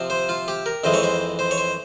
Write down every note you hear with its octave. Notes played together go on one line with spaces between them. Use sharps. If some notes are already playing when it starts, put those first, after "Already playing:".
Already playing: C3 F3 C4
C5
F4
G4
A#4
F2 E3 G#3 C5
C#5
C5
C5
C#5
C5